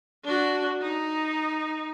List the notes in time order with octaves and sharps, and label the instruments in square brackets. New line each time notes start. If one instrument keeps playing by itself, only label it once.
[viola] D4 F#4
D#4